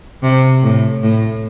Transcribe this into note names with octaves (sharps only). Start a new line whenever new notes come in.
C3
A2
A2